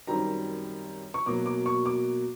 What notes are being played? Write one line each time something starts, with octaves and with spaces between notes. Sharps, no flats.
F#2 D#3 G3 C4 A#5
C#6
B2 F#3 A#3 D6
D6
C#6
D6